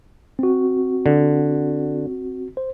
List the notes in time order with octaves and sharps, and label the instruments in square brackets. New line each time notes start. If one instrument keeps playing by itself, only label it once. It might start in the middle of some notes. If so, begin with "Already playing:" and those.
[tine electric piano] C4 F#4
[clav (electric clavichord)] D3
[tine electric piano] C5